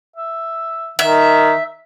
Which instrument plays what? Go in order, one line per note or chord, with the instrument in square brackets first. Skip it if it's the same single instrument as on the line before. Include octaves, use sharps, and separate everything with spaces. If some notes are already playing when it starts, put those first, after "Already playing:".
[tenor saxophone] E5
[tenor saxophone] D#3 [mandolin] E5